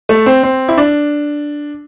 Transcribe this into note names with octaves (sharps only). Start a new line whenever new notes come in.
A3
C4
C4
E4
D4